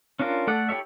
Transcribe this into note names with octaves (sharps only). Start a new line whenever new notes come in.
C#4 D4 F4 A#4
A3 A4 D5 F#5
E4 G4 A4 C#5 E5